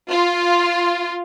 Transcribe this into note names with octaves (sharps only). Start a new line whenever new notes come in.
F4